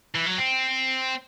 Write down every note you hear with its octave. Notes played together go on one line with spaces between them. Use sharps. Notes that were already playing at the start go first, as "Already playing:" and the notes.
E3
F#3
C4